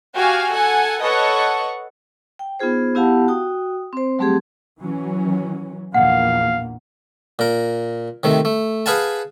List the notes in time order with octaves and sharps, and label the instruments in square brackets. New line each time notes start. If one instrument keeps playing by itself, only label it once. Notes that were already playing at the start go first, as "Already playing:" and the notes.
[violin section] F#4 G4 F5 G#5
A4 F#5 G#5
A4 B4 C#5 D#5 F#5 C#6
[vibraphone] G5
B3 D#4 F4 G#4 C5
B3 E4 G4 F5 F#5 A5
F#4 G5 D#6
C4 C5
F#3 G3 A3 C4 G4 G#4
[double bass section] E3 F#3 C#4
[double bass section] A#1 E2 A#3 [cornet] F5 [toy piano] F#5
[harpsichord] A#2 A#4
C3 D#3 A3
A3
G#4 B4 F5 F#5 G#5 A5